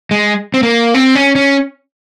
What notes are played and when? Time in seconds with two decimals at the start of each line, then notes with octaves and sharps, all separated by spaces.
0.11 G#3
0.54 C4
0.63 A#3
0.94 C4
1.15 C#4
1.36 C#4